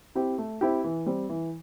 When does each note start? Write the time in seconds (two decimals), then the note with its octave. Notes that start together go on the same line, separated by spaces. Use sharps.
0.15 C4 E4 G4
0.38 A3
0.61 C4 E4 G4
0.84 E3
1.06 G3 C4
1.29 E3